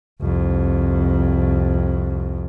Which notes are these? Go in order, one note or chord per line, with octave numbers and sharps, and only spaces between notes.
C2 F2